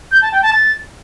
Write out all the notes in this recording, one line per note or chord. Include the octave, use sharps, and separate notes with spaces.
G6
A5
G5
A5
A6